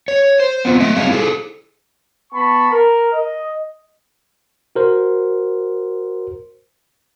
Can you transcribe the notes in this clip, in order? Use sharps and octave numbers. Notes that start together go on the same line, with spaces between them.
C#5
C5
B3 C4 F4
A3 D#5 E5
F#3 G3 C4 D4 G#4 F5
E4 G#4 A4
B3 A5 B5 C#6
A#4
D#5
F#4 A#4 C5